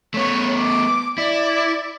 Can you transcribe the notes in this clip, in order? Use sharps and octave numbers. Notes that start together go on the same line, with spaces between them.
A3 B3 C#5
D6
E4 D5